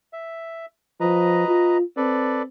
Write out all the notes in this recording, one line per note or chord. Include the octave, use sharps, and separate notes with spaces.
E5
F3 B4 D#5 A#5
F4
C4 A4 B4 D5